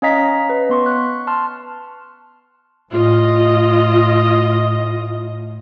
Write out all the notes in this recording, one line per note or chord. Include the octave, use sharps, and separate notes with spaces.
C#4 C#5 D#5 F5 A#5 B6
B4
B3 C6 C#6
C#6 F#6
A5 C6 F6
A2 F4 D#5